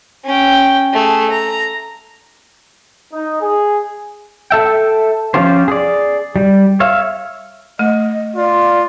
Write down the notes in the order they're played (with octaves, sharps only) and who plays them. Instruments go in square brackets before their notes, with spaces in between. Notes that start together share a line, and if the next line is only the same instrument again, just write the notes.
[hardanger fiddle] C#4 G5
A3 G#4
A#5
[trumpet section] D#4
G#4
[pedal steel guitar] A4 E5 G5
F3 C#4 F4 G4 C5
G#4 D5
G3
C#5 E5 F5
[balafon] A3 [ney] D#5
[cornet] F4 [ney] D5